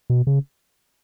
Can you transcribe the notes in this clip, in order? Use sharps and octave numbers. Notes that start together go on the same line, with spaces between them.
B2
C#3